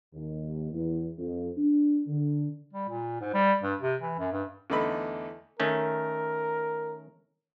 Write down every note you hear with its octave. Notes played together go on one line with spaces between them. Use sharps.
D#2
E2
F2
D4
D3
G3
A#2
G#2
G3
G2
C3
E3
F#2
G2
E2 D3 A3 D#4 B5
D#3 A3 C#4 A#4